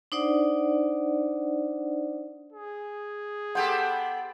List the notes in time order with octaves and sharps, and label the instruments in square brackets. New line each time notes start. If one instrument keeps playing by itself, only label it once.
[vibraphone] D4 D#4 C5 D5 F#5
[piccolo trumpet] G#4
[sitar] B3 G4 A4 [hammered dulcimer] C5 G5 B5 [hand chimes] F#5